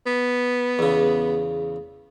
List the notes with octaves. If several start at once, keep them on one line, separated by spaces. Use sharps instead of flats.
B3
E2 C#3